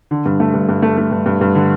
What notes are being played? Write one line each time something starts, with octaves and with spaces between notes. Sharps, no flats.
D3
G2
A3
G2
G2
A3
A3
G2
G2
G2
D3